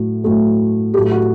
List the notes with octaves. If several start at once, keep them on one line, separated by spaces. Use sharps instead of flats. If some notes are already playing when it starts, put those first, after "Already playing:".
Already playing: A2 F#3 A3
A2 F#3 A3
A2 F#3 A3 G4
F#4